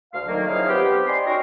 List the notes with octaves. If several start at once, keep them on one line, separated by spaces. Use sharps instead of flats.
D2 F5
D3 D#3 F#3 A#3
F3 C#4 D#4 E4 G#4 F5
B3 C4 G4
D5 D#5 G5 G#5 C6
C#4 D#4 F#4 A#4